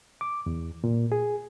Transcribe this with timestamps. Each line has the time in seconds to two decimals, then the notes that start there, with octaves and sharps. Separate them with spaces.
0.21 D6
0.46 E2
0.84 A#2
1.12 G#4